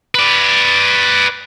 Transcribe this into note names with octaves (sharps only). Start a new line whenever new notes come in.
B4 D5